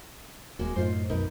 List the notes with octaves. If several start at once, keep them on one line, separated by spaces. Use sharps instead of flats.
D#1 G#3 A#3 F#4
F#2 A2 D#4 F4 C5
B1 F#2 D#4 A#4 B4